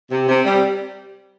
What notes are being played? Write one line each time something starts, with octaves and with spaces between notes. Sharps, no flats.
C3
C3
G3